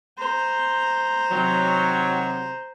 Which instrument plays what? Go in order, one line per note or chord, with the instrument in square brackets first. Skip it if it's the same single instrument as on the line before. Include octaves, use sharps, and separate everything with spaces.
[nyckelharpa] C5 A#5
[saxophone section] C3 D#3 F#3